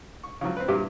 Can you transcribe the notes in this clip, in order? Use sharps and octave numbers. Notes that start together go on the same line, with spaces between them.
C#6
C#3 F3 F#3
C4 B4
E2 G2 A#2 G4 E5